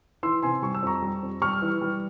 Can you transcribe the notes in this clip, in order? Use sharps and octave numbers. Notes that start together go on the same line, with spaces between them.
E3 C6 E6
C3 G#5 C6
G3 C#6
E6
F2 A#5 C#6
G3
F2
G3 C#6 F6
E3
G3